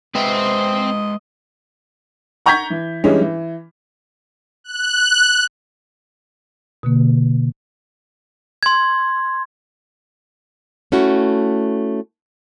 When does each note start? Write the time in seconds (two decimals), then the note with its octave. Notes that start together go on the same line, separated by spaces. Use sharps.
0.15 G#3 C4 B4 D#5 E5
2.46 F#5 A#5 C#6 G6 G#6 B6
2.70 E3
3.04 E3 G3 G#3 C#4 D4
3.21 E3
4.64 F#6
6.83 B2 D3 A#3
8.63 C6 G#6
10.92 A3 C#4 E4 F#4